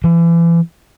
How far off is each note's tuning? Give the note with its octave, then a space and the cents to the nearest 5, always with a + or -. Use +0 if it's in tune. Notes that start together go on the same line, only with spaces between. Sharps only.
E3 +35